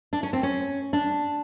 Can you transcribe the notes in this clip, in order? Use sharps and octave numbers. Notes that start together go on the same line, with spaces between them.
D4
C#4
C4
C#4
D4